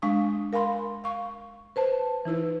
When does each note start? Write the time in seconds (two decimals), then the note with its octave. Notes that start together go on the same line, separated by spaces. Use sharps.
0.02 G#3 D4 F5 C#6 D#6
0.53 A#4 F5 G#5 B5 C6
1.04 F5 C#6
1.76 B4 C5 A5
2.25 E3 D#4 E4 B4